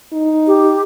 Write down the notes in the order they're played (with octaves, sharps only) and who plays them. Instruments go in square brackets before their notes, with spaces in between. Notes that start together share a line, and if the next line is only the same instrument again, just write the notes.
[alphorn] D#4
[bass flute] G4